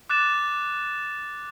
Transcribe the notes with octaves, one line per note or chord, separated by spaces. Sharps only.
D6 F#6 A6 E7